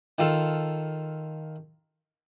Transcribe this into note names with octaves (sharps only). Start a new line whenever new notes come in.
D#3 F4 A4